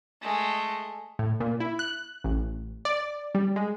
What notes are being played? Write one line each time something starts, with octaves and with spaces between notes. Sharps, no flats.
G#3 A3
A2
A#2
E4
F#6
A1
D5
G3
G#3